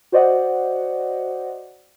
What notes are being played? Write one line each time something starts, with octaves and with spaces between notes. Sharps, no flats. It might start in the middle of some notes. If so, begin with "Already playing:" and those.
F#4 C5 D5 D#5 F#5